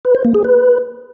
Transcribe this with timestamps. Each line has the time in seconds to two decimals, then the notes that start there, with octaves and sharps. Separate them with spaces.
0.05 B4
0.15 C5
0.25 A#3
0.34 G#4
0.44 B4